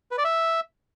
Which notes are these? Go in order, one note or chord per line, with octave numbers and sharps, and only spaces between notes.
B4
D5
E5